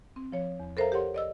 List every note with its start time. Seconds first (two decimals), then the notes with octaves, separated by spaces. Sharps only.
0.16 C4
0.32 F3 C#5
0.60 E2
0.77 A4 A#4 C5 E5 F5 A#5
0.92 G4 A#4 C#5 F#5 C6
1.14 D5 D#5 E6